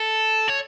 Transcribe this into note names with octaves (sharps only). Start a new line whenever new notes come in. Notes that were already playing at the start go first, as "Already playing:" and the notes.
Already playing: A4
C#5